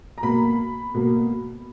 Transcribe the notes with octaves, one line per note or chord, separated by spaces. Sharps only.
A#5
B2 A#3 B5
B2 A#3